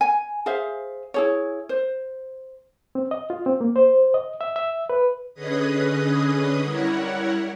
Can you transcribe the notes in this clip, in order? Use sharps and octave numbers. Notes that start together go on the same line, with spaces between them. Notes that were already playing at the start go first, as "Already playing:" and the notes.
G#5
G#4 C5 E5 F5
E4 G#4 C#5
C5
C4
D#5
F4
C4
A#3
C5
D#5
E5
E5
B4
D3 C#4 G#4 B4 D#5 D#6
G3 E4 A#4 C#5 F#5